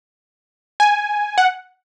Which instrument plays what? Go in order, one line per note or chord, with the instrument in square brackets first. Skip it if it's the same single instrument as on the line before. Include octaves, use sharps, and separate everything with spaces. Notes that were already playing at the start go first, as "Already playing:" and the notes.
[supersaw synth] G#5
F#5